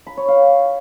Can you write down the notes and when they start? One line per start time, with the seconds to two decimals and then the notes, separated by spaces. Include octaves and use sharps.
0.07 B5
0.17 C#5
0.28 F5